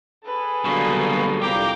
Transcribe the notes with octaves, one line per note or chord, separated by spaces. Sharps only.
G#4 A4 B4
B2 D3 F#3 G3 A#3
C2 F2 G4 F5 A#5 D6